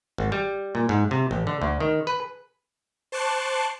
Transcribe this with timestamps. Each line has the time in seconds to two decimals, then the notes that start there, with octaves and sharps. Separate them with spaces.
0.18 G#1
0.32 G3
0.75 A#2
0.89 G#2
1.11 C3
1.31 A1
1.47 D3
1.62 D2
1.80 D#3
2.07 B4
3.12 C5 A5 C#6 D6 F#6 C7